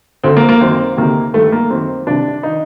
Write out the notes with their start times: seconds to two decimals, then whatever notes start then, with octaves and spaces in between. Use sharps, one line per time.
0.24 D2 D3 C4
0.37 A#3
0.49 A#3
0.61 F#2 D#3 C4
0.97 D2 C3 D#3 A#3
1.34 G2 D#3 A3
1.52 A#3
1.70 F#2 D#3 C4
2.07 C2 C3 D#3 D4
2.43 D#3 D#4